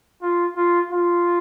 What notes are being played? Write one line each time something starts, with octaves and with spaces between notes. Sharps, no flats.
F4
F4
F4